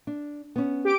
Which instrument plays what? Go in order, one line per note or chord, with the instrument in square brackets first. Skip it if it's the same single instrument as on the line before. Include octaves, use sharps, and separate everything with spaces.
[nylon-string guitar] D4
B3 C#4
[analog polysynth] G4 D6 D7